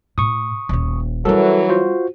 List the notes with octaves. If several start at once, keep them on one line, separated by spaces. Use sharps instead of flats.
A2 E4 C#6 D#6
D#1 C#4
E3 F#3 G3 C#4 A4 A#4
F4 F#4 C5